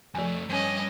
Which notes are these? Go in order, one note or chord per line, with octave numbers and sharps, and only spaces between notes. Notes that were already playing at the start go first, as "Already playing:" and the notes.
F2 F3 A3 G#5
G2 C#4 D#5